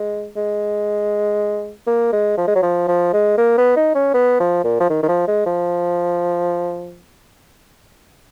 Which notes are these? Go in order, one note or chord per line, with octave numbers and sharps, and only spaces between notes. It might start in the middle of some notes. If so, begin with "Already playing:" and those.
Already playing: G#3
G#3
A#3
G#3
F3
G#3
F#3
F3
F3
G#3
A#3
B3
D#4
C#4
B3
F3
A#2
F3
D#3
D#3
F3
G#3
F3